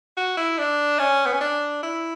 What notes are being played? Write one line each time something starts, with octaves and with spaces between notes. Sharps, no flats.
F#4
E4
D4
C#4
B3
C#4
D4
E4